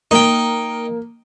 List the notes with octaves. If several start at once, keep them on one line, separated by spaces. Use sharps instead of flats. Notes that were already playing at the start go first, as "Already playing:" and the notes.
A#3 D#4 G5